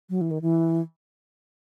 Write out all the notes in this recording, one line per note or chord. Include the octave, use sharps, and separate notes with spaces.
F#3
E3
D#3
E3